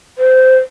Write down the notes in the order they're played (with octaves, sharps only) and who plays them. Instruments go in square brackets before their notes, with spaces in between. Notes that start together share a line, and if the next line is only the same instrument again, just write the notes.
[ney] C5